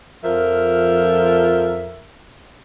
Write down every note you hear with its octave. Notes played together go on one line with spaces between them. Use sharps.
F2 F3 A#4 E5